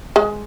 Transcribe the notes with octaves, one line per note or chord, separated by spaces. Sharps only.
G#3